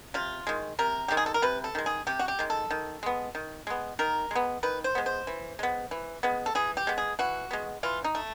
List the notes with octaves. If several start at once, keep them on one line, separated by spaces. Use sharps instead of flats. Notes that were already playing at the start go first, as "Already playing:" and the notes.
C3 F4
D#3 G#3
C3 A#4
D#3 G#3 G4
G#4
A4
A#4
C3 B4
A4
D#3 G#3
G#4
C3 G4
F#4
G4
D#3 G#3
A4
D#3
G#3 B3
D#3
G#3 B3
D#3 A#4
G#3 B3
D#3 B4
C5
G#3 B3
C5
E3
G#3 B3
E3
G#3 B3
A4
E3 G#4
G4
G#3 B3
G#4
E3 F#4
G#3 B3
E3 F4
D#4
A3